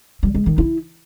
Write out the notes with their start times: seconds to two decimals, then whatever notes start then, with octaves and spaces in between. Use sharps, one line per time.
0.23 G3
0.34 G#3
0.46 D#3
0.58 E4